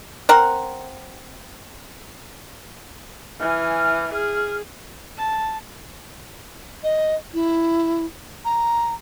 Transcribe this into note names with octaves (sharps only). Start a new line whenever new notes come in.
C4 A#4 F#5
E3 G#5 F6
G#4 F6
A5
D#5
E4
A#5